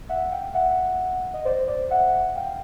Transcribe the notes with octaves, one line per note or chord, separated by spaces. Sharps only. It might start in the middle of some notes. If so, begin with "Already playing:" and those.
E5 F#5
F5 G5
E5 F#5
D#5
C5 D5
C5 D5
E5 F#5
F5 G5